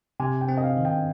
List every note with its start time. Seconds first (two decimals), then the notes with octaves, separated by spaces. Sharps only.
0.20 C3 G#5
0.41 G5
0.48 C4
0.57 D#5
0.63 F5
0.77 D#3
0.85 G5